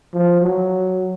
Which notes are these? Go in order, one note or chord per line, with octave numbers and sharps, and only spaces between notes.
F3
F#3